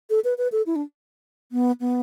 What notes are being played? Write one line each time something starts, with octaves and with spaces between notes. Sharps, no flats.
A4
B4
B4
A4
E4
D4
B3
B3